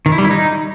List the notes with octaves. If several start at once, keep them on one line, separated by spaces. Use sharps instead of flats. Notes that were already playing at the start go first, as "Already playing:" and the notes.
D#3
E4
G3
E4
D#4